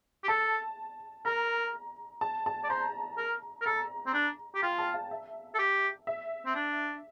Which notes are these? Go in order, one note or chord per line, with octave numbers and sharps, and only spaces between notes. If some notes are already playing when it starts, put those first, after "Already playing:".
G4
A4 A5
A#4 A#5
A5
A5
D5
C5 A#5
A#4
A#4
A4 A#5
C4
D4
G4
F4 G5
A5
F5
E5
A4
G4
E5
C4
D4